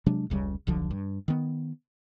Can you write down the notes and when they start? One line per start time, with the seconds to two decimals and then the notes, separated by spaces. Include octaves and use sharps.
0.06 C3 F#3 G#3 D4
0.30 F1 C#2 C#3 G3
0.67 D#1 B1 D3 F3
0.91 G2
1.28 D#3 B3